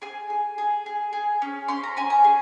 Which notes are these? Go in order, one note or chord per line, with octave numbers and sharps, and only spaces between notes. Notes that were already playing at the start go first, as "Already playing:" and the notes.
G#4 G#5
G#4
G#4
G#4
G#4
C#4
C#4 C6
A#5
C#4 G#5
A#5
G#4